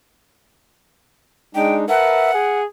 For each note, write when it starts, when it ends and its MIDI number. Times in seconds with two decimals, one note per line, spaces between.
1.55 1.85 56
1.55 1.85 62
1.55 1.85 63
1.55 1.75 79
1.89 2.31 70
1.89 2.31 71
1.89 2.29 76
1.89 2.59 78
1.89 2.31 81
2.34 2.65 68
2.34 2.65 80